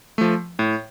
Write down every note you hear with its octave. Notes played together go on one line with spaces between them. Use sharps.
F3 A3
A2